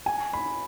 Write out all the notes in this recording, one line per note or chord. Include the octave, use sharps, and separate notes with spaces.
G#5
B5